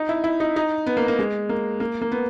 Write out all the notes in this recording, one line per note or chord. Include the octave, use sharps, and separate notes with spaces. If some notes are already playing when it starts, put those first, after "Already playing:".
Already playing: D#4
E4
E4
D#4
D#4
B3
A#3
A#3
G#3
A#3
A#3
A#3
B3